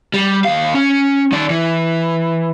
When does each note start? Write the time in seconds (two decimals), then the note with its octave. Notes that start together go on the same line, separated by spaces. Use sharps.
0.14 G3
0.45 D#2 F5
0.75 C#4
1.32 D#3 D5
1.50 E3